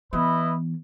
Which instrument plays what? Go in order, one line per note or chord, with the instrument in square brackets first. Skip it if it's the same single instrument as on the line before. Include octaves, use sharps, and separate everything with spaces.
[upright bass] E3 B3 [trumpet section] E4 B4 D#5